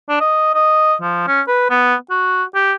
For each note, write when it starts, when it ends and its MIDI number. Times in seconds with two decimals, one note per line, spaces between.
0.09 0.18 62
0.20 0.52 75
0.54 0.94 75
1.01 1.25 53
1.27 1.41 61
1.48 1.66 71
1.70 1.94 59
2.10 2.44 66
2.55 2.73 67